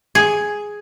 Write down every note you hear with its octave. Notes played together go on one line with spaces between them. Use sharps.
G#4